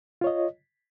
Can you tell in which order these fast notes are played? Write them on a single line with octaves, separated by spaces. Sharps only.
F4 C#5 D#5